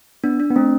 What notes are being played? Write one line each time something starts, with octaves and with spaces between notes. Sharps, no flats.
B3 D4
D4
B3
A3 C4